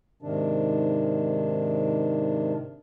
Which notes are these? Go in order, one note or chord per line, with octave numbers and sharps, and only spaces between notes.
G#2 C3 D#3 D4